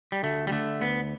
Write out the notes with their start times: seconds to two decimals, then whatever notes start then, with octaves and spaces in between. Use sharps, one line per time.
0.12 G3
0.23 D2 A3
0.47 G3
0.52 D3 A3
0.81 D2 B3